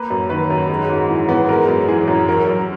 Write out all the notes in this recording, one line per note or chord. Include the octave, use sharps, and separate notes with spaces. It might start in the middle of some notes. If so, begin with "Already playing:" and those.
Already playing: A#3 B4
F#2
D#3 B4
F#2
G#3
G#2
E3
B3
G#3 A#4
F#2
E3 G#4
F#2
F#3 A#4
F#2